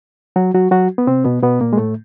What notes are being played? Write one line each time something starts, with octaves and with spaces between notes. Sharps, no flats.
F#3 F#4
F#3 F#4
F#3 F#4
B3
C3 C4
B2 B3
B2 B3
A#2 A#3
G#3
A2 A3